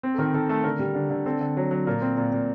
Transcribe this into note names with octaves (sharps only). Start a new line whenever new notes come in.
C4
A4
D#3 A#4
D#3 A4
A3 A4
D3 A#4
G3
D3
D3
C4 A4
D3
F#3
F#3
A#2 A#4
C4
A#2
A#2